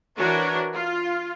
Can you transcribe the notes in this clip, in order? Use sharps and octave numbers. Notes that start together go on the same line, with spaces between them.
E3 D4 F#4 A#4 B4 C#5
F4